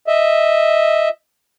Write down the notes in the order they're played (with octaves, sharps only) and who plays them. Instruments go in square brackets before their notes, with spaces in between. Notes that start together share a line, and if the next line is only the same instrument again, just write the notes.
[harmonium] D#5 E5